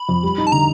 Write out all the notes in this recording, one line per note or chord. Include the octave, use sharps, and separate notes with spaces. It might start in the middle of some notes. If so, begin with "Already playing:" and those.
Already playing: B5
F2
G3
D#4
A5
D3 A#5